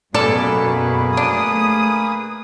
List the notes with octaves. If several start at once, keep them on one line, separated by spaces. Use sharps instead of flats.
F#2 B2 A#3 G#4 A4 B4 D5
A3 D4 D#6